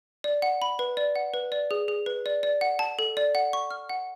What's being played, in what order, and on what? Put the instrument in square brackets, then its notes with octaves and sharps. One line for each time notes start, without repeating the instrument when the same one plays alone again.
[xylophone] D5
F#5
B5
B4
D5
F#5
B4
D5
G#4
G#4
B4
D5
D5
F#5
A5
A4
D5
F#5
C#6
F6
F#5